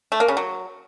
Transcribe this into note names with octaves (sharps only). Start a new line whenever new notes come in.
A3
A#3
C#3
F#3